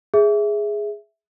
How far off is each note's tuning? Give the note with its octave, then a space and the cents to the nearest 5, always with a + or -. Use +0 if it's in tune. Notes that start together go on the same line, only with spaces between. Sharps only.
G#4 +0 E5 +0